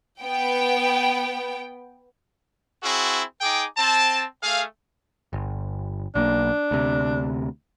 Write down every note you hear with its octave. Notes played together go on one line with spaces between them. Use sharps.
B3 G5
C4 E4 F#4 G#4
D#4 G#4 G5 D6
C4 A5
A3 G#4 F5
G1
B1 A#3 D4
D2 C3